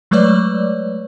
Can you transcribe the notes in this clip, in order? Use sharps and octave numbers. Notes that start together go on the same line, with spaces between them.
F#3 G#3 A3 B4 C#5 D5